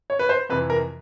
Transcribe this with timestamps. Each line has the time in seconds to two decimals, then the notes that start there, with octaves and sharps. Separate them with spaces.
0.10 C#5
0.19 B4
0.29 C5
0.49 F2 C3 E3 B4
0.70 A#4